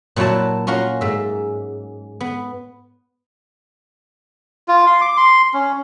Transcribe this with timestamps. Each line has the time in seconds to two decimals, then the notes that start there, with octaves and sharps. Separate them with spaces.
0.16 A#2 F#3 E4 F#4 A5
0.67 C#4 F4 F#4 A#4
1.01 G#2 E5
2.20 B3
4.68 F4
4.87 C6
5.01 D6
5.17 C6
5.54 C#4